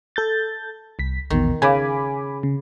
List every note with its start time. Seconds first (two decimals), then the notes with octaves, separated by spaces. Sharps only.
0.16 A4 G6 A6
0.99 C2 B6
1.30 A#1 E2 B2 D#3
1.62 C#3 G#5 B5 D6
2.43 C#3